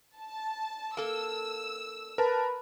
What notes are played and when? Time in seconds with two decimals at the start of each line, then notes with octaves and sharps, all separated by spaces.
0.18 A5
0.97 A#3 A4 E6
2.18 A#4 B4 A5